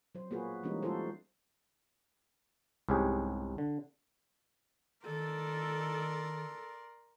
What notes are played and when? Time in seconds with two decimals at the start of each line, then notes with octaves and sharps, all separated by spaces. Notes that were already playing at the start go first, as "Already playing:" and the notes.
0.15 F#3 C5
0.31 A#3 B3 F4 F#4 G#4 B4
0.63 E3 G3 G#3 A#3 C#4 D#4
0.83 G3 A3 F4 F#4 A4 C5
2.89 C2 G#2 C#4 G4 G#4
3.58 D3
5.06 D#3 A4 A#4 D5 C6